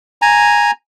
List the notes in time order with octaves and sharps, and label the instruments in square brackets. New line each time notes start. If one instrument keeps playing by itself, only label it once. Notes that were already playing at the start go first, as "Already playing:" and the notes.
[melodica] G#5 A#5